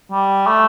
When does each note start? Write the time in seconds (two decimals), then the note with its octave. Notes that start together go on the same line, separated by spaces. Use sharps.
0.12 G3
0.47 A3